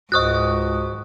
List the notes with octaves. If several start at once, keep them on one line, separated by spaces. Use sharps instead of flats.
C#2 G#2 F#4 C5 D#5 C#6 D#6 F#6